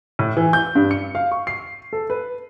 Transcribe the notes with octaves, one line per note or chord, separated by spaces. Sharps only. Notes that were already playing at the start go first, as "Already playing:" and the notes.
A2
E3
G6
G2
C#7
F5
C#6
C7
A4
B4